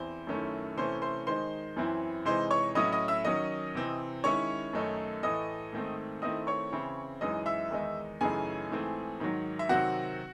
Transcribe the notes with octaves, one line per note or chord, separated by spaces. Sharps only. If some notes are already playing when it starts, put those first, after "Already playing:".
Already playing: E2 C4 E4 C5
F#2 D#3 A3 C#4 E4
C3 E3 A3 C#4 E4 C5 C6
C5 C6
D#3 G#3 D#4 C5 C6
F#2 E3 C4 E4
C3 E3 G#3 D#4 C5 C6
C#5 C#6
A2 F#3 C#4 E4 D#5 D#6
D#5 D#6
E5 E6
D#3 F#3 C#4 D#5 D#6
C3 E3 C4
D#3 G#3 C#4 E4 C#5 C#6
F#2 D#3 A3 D#4
A2 E3 A3 D#5 D#6
G#2 D#3 A3 C4
D#3 A3 C4 E4 D#5 D#6
C#5 C#6
C#3 E3 C4 E4
F#2 E3 G#3 D#4 D#5 D#6
E5 E6
E2 D#3 G#3 D#4
F#2 C#3 E3 A3 D#4 G#4 G#5
G#2 E3 A3 C4
G#2 D#3 F#3
E5
C3 D#3 F#3 C4 F#4 F#5